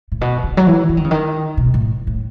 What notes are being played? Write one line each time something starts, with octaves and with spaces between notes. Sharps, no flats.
A2
B2
C#3
F#3
E3
E3
D#3
C#3
D#3
B2
A2
A2